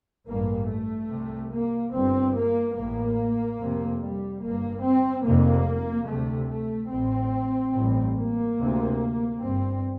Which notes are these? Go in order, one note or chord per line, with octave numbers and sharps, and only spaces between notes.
A1 G2 A#3
A3
C2 C3
A#3
G1 G2 C4
A#3
A1 A2 A#3
F1 F2 C3
G3
G1 G2 A#3
C4
F1 F2 C3 A#3
D2 C3 A3
A3
A1 A2 C4
A1 G2
A#3
D2 C3
G1 G2 C4